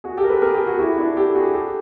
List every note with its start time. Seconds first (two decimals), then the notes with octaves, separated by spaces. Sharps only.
0.04 F#4 G#4
0.17 G4 A4
0.24 A#4
0.29 A4 B4
0.42 G#4 A#4
0.54 G4 A4
0.67 F#4 G#4
0.79 E4 F#4
0.98 D4 E4
1.17 G4 A4
1.35 F#4 G#4
1.54 G4 A4